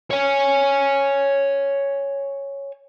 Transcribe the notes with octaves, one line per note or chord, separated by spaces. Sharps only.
C#5 G#5